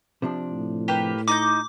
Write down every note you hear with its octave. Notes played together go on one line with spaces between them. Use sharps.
C3 F3 D4
A2
A#3 G4 B4
D#4 D#5 D6 G6